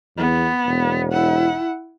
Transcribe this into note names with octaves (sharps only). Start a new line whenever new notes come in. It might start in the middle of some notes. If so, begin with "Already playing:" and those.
E2 B3
E1
E4 F#5